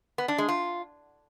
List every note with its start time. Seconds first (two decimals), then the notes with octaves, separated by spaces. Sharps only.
0.18 B3
0.28 D4
0.38 G#3
0.48 F4